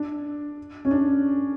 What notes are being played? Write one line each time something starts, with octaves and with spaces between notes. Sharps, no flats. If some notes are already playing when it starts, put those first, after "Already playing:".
Already playing: D4
C#4
D4